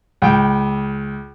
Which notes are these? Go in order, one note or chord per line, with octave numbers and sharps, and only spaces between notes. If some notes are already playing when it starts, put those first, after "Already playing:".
C#2 G5